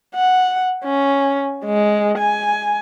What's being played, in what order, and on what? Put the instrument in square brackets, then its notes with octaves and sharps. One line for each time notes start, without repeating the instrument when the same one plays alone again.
[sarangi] F#5
C#4
G#3
G#5